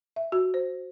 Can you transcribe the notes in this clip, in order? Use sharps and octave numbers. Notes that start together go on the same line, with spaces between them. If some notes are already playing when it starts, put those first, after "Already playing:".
E5
F#4
C5